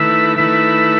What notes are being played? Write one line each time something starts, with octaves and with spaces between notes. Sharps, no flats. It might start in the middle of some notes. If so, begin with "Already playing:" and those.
Already playing: D#3 A3 E4 B4 E5
D#3 A3 E4 B4 E5